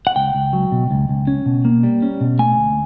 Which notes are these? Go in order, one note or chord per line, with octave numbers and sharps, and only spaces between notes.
F#5
C#2 G5
C#2
F#3
B2
C#2
C#2
C#4
B2
A#3
G3
C#4
B2
A3 G#5
D2